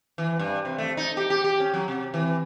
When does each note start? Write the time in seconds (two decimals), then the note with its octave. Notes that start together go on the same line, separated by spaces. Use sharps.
0.18 E3
0.39 G2
0.65 C3
0.78 A3
0.97 D#4
1.17 G4
1.30 G4
1.44 G4
1.60 C#4
1.74 F#3
1.88 C3
2.14 E3